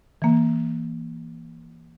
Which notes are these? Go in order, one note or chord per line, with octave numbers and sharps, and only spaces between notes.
E3 A#3